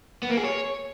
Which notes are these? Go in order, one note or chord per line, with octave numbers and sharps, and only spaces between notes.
B3
A#3
G#4
C#5